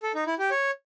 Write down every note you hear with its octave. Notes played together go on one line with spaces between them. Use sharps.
A4
D#4
E4
G4
C#5